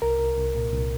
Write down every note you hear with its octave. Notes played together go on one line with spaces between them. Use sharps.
C2 A#4
C2
C2
A#2
C2